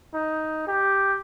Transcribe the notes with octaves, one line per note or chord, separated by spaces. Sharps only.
D#4
G4